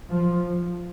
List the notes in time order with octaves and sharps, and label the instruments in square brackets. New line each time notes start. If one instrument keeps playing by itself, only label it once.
[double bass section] F3